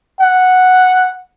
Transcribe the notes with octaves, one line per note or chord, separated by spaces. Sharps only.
F#5